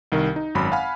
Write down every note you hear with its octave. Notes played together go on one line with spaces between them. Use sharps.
C2 D#3 A#4
D#4
G#1 F#2 B5
F5 F#5 G#5 B5 F6